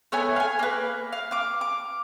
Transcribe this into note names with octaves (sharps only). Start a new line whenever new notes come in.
A3 B3 C#5 G#5
F5 G#5
A#3 B4
F5
F5 D6
D6